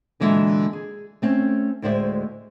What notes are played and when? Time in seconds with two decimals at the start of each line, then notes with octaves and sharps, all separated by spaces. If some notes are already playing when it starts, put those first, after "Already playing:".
0.20 A#2 D3 E3 F#3 G#3 E5
0.73 G#4
1.22 A3 C4 C#4
1.82 D2 A2 G#3 C5 D5 E5